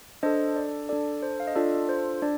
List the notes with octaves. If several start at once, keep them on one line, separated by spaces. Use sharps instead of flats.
D4 A4 C5 D#5
D5
D4 A4 D5
C5
F5
D#5
D4 F4 A4 D5
C5
D4 D5